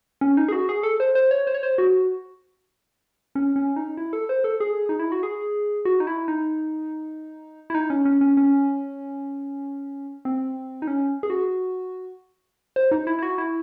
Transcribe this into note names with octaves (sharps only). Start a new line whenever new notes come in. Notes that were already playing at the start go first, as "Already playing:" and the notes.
C#4
D#4
G#4
F#4
G#4
A4
C5
C5
C#5
C5
C#5
C5
F#4
C#4
C#4
D#4
E4
A4
C5
A4
G#4
D#4
E4
F#4
G#4
F#4
D#4
E4
D#4
E4
D#4
C#4
C#4
C#4
C#4
C4
D#4
C#4
G#4
F#4
C5
D#4
E4
E4
F#4
E4